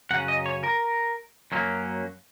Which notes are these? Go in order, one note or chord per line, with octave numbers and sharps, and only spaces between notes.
F#2 C#3 F#3 C#4 F#5
D#5
C#5
A#4
F#2 F#3 A#3 C#4